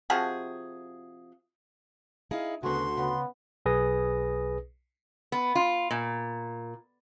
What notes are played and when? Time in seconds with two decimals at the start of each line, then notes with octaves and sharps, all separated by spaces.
0.10 C3 F3 F#4 G#4
2.31 D#4 E4 G#4 F5
2.63 D2 C#3 B3 F#4 C6
2.97 C#3 B3
3.66 B1 G#4 B4 D#6 A#6
5.32 B3
5.55 F4
5.91 A#2